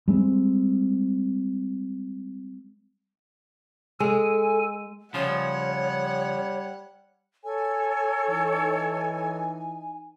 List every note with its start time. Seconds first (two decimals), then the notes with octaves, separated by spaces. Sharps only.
0.08 G3 G#3 C4
4.00 G#3 A4 G#5
5.14 C#3 F3 G3 C#5 F#5
7.44 A4 C#5 G#5
8.28 E3 D#4